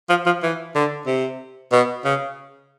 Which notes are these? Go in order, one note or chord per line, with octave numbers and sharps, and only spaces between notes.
F3
F3
E3
D3
C3
B2
C#3